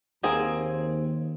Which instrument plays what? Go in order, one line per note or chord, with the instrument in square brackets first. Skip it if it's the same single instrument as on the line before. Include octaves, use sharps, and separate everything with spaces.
[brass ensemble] D#2 [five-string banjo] A#3 C4 G#4